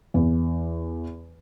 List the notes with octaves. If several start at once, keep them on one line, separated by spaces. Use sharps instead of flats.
E2